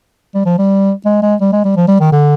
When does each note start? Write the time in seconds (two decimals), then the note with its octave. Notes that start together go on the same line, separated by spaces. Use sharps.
0.34 G3
0.45 F3
0.58 G3
1.05 G#3
1.22 G#3
1.40 G3
1.52 G#3
1.65 G3
1.76 F3
1.88 G3
2.00 D#3
2.12 D3